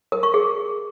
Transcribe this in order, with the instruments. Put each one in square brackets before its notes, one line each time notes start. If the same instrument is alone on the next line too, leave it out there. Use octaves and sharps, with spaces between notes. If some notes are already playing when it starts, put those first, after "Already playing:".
[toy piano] A#4
C#6
G#4